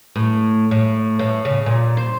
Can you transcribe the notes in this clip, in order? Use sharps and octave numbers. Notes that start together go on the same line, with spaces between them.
A2
A2
A2
C#3
A#2
C5